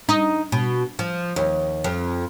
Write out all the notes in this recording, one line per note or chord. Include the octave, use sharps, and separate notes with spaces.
D#4
B2
F3
D#2
F2